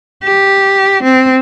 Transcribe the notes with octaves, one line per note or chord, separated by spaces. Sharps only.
G4
C4